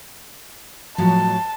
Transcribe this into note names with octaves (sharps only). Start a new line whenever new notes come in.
A2 F3 F#3 A5